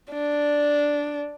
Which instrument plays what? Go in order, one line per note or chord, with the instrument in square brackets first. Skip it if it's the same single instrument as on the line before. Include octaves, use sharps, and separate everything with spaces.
[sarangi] D4